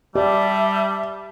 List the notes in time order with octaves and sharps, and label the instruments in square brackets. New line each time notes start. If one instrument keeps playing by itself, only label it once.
[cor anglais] G3 [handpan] G4 [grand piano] D5 [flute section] E5 A5